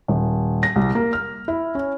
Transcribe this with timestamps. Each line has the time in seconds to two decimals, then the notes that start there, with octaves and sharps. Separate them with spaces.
0.08 D#1
0.63 A#6
0.76 C2
0.95 A#3
1.13 F6
1.48 E4
1.75 C#4